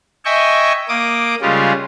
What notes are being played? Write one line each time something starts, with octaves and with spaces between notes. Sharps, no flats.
D#5 E5 G5 G#5 C#6
A#3 D6 D#6
C#3 G3 G#3 C#4 F4